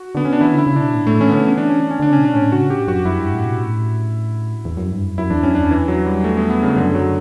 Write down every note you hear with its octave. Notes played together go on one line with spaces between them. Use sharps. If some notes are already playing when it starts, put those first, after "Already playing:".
Already playing: F#4
D3 B3
C#4
D4
E3 E4
D3 E4
C#3
B2 D4
A2
A2 A3
E3 C#4
B3
D3 C#4
E3 C#4
D4
C#4
D4
C#4
D3 D4
C#3 C#4
B2
D4
A2 C#4
C#3 F#4
A2 G4
F#2 F#4
F#2 E4
G2
A2
B2
A2
E2
F#2
G2
F#2
F#2 E4
E2 D4
F#2 C#4
E2 D4
E3
F#3
G3
A3
B3
B3
C#3
F#2 D3
F#3